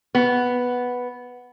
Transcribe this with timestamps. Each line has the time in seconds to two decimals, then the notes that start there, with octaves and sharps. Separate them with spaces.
0.15 B3